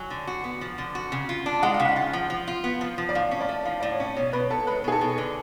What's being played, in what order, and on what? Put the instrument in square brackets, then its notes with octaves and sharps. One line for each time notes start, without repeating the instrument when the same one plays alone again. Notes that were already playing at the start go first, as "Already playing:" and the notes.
Already playing: [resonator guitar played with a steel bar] F#3 [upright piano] G#5
[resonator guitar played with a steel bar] D3
F#4
B3
F3
D3
F#4
C#3
F4
D4
[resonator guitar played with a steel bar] G#3 [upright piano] F#5
[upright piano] F5
[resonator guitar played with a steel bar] C#3
[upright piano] F#5
[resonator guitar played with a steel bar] F4
F3
F3
F4
B3
F3
F3
[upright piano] D5
[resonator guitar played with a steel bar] A2 [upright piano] F5
[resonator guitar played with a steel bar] C#4
[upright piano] D5
[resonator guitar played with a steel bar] A3
[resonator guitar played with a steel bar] F3 [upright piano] F5
[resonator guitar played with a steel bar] A2 [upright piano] D5
[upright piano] C#5
[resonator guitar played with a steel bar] C#4
[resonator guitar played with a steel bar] B2 [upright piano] C#5
[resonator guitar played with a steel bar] B2 [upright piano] B4
[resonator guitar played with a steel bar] B3 [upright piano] A4
[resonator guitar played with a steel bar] G#3 [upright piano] B4
[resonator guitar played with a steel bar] B2 [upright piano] G#4
[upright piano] A4
[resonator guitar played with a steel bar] B2
D3